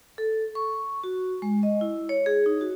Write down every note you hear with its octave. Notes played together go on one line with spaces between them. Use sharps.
A4
C#6
F#4
G#3
D#5
E4
C#5
G#4
D#4
F#4